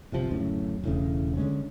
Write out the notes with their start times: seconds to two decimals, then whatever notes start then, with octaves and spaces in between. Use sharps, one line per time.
0.12 G1 C3 F3
0.31 D1 F#2 A2 C#3
0.84 E1 A2 C#3
1.37 D3 F#3 G#3 C#4